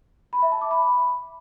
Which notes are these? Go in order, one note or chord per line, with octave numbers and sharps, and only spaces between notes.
B5
E5
A5
D6
B5